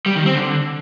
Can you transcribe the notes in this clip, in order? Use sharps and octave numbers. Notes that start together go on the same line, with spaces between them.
G3
D#3
C4
D3